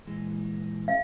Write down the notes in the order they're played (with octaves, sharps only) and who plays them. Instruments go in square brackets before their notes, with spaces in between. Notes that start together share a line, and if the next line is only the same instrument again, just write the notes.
[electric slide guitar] A#2 E3 G#3
[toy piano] F5